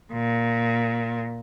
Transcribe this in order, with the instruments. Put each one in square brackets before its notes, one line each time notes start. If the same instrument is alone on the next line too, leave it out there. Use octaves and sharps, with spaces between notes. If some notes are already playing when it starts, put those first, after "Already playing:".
[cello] A#2